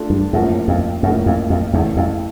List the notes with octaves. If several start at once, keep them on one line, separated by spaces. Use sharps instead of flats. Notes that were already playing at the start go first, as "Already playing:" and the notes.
Already playing: A3 D4 F4 A4
G2
F#2 A2 F3 A#3 C#4
F2
F#2 A2 F3 A#3 C#4
F2
F2
E2 C#3 E3 A3
F2